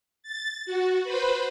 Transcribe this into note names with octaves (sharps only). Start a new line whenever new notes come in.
A6
F#4
B4 C5 B5